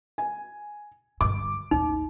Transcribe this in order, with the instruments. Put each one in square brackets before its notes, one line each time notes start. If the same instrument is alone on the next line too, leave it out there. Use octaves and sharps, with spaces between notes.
[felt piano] G#5
[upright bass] G2 D3 [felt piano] D6
[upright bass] A1 D#2 [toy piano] D#4